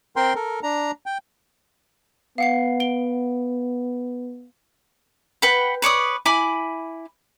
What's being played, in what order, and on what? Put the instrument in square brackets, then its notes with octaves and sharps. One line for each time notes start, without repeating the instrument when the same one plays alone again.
[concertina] C4 A#4 G5 C6
A4 A#4
D4 A#5
G5
[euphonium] B3 [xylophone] F5 F#5 C7
[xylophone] D7 G7
[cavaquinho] B4 F#5 G5 B5
B4 C#5 D5 D#6
E4 G#5 B5 D6